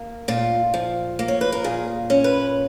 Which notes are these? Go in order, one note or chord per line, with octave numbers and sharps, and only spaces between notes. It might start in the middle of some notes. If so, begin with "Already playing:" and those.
Already playing: A#3
A#2 F4
F3
A#3
C#5
B4
A#4
A#2 G#4
C#4
B4